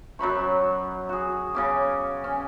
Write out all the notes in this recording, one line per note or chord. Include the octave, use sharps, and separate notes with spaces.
F#2 F#3 B5 C#6
F#4 G#4
C#3 C#4 D6
C#4